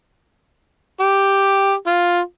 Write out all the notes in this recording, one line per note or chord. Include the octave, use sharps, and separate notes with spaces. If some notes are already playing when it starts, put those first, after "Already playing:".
G4
F4